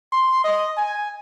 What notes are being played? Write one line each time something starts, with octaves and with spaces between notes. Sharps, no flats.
C6
D#5
G#5